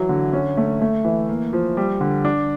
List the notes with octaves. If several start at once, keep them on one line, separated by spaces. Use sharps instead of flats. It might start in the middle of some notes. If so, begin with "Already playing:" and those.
Already playing: E3 F#3
D3
C#4
A3
A3
E3
A#3
F3
G3
D3
D4